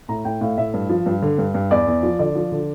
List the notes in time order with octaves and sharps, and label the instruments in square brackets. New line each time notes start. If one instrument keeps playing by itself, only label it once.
[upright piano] A2 A#5
A2 G5
A2 F5
A2 E5
G2
F3
G2
D3
G2
G2
E2 D5
E2
F3
D3 D5
F3
D3